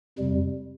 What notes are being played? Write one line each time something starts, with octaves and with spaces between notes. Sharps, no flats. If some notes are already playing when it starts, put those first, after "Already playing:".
F2 C3 G3